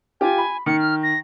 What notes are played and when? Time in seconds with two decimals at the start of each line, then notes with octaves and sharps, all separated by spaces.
0.21 F4 G4 G#5
0.38 B5
0.66 D#3 C#7
0.79 F6
1.03 A#6